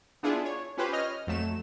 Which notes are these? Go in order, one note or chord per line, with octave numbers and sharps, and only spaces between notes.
B3 D4 E4 F4 G#4
C#5
C#4 F4 G4 B4 C5
C#5 D#5 F6
F2 F#3 A3 E7